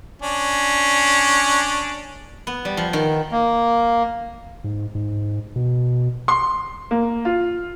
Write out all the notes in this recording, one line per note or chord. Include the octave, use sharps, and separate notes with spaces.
C#4 D4
B3
G3
F3
D#3
A#3
G#2
G#2
B2
C6
A#3
F4